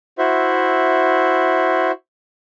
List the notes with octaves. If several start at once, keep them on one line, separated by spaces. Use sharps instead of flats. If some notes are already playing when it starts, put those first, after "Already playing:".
E4 F#4 C5 E5